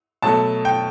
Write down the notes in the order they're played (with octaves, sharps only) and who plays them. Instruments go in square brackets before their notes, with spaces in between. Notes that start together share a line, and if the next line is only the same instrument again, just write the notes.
[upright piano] B2 F#3 A3 A5
G5